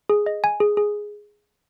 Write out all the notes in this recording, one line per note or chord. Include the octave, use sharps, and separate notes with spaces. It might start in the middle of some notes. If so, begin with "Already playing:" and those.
G#4
D#5
G#5
G#4
G#4